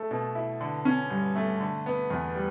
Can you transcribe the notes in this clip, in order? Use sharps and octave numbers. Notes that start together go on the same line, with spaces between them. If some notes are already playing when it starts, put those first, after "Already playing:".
Already playing: A3 A4
B2
E4
D3
C#4
G2
A3
D3
B3
E2
G3